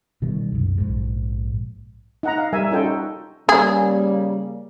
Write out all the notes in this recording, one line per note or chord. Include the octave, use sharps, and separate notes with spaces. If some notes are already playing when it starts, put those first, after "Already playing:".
B2 D#3 G3
C2 F#2
A#1 G#2
D#4 F#5 A#5
F5
G3 A#4 E5 G#5
C#4 D#4 F4 A4 G5
F#4
C#3 G3 A#3 G#4